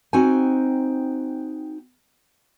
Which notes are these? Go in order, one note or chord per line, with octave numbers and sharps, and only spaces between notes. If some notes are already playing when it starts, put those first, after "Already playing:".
C4 D#4 F#4 C5 G5 G#5